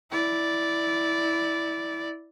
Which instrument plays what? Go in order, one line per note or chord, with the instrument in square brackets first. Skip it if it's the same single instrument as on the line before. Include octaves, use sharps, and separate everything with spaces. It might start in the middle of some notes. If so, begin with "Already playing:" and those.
[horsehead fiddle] E4 D5